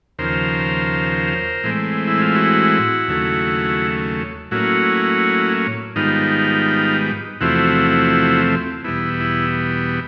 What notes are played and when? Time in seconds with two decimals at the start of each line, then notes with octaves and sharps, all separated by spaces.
0.19 D#2 C#3 F3 A#4 C5
1.63 A2 E3 G#3 C4
2.07 E4
2.22 F4
2.35 E4 F#4
3.08 D#2 C#3 F#3 A3
4.51 A2 F#3 A#3 C#4 E4 F#4
5.96 G#2 D#3 G3 B3 D#4 F4
7.40 E2 C3 F3 A3 C4 E4 F#4
8.84 E2 B2 G3 B3 E4
9.21 E4